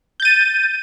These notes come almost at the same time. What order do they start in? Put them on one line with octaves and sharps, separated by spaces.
G6 A6 D#7